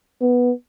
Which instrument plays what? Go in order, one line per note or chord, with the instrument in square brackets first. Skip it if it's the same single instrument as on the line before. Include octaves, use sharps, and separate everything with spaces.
[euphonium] B3